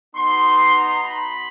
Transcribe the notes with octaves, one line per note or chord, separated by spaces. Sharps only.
B3 D#4 F#4 C6
A#5
B5